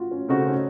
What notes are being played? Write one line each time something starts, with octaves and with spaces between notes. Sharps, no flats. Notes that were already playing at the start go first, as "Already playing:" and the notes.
Already playing: F4 F#4
C#4
C#3 A3 C4 D#4 F#4
C#4